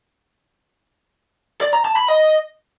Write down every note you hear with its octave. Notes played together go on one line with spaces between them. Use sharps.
D5
A#5
A5
B5
D#5